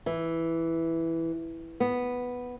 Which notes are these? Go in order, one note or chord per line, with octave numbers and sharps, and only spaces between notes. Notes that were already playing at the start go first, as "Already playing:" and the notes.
E3
B3